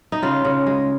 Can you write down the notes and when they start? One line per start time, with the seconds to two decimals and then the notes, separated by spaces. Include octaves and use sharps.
0.12 D#4
0.22 C#3 F4
0.45 C#3
0.66 G#3